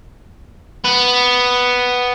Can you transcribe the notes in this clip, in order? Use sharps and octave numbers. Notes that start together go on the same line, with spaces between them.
B3